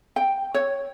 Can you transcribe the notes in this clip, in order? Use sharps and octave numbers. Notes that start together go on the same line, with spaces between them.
G5
C#5